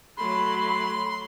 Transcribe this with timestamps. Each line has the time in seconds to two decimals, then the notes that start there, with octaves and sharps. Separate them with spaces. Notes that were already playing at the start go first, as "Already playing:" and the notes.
0.17 F#3 A3 B5 C6